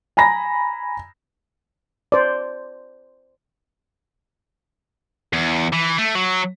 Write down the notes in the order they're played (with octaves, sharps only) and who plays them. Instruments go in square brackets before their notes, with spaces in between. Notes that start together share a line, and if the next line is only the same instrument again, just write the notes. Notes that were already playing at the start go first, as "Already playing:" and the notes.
[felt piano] G#5 A#5 B5 A#6
[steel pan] C5 D5
[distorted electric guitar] E2
E3
A3
F#3